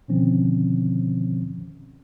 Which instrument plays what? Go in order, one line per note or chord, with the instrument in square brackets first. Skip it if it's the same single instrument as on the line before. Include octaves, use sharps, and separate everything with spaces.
[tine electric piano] B2 D3 D#3 F3 C4 C#4